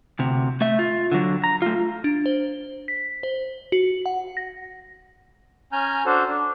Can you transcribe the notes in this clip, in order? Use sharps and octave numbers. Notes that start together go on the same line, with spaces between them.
D2 C3
A3 E5
F4
D3 F#3
A#5
A3 F4
D4
C5
B6
C5
F#4
F#5
A#6
C#4 G#5 A#5 F6 G6
D4 F#4 A4 C5
D4